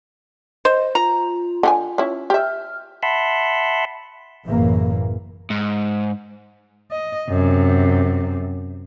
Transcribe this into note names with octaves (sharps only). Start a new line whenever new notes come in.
C5 D#5
F4 A#5
D3 D#4 G#5
C#4 E4
G4 E5 F6
E5 F#5 A5 B5 C6
A1 F#2 A2 C#3 E3 A#3
G#2
D#5
F#2 C3